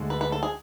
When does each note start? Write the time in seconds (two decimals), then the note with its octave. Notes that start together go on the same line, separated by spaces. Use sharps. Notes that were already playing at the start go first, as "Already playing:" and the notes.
Already playing: D2 D3 G#3
0.10 B4
0.21 B4
0.32 A4
0.43 G#4